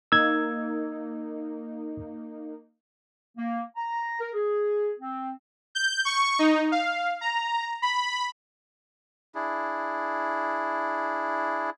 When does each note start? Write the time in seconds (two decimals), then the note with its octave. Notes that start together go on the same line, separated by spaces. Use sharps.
0.12 A#3 D#4 E6 G#6
3.37 A#3
3.76 A#5
4.20 A#4
4.34 G#4
4.99 C4
5.75 G6
6.05 C#6
6.39 D#4
6.72 F5
7.21 A#5
7.82 B5
9.35 D4 E4 G#4